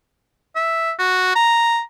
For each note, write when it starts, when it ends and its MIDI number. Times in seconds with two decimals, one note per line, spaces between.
0.56 0.92 76
0.99 1.32 66
1.36 1.80 82